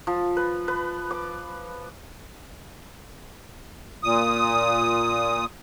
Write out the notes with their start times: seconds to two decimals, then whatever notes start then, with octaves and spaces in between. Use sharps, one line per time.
0.07 F3
0.37 B4
0.68 B4
1.11 D6
4.03 A#2 D#6